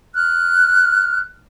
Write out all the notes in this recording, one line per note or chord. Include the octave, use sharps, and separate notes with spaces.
F6 F#6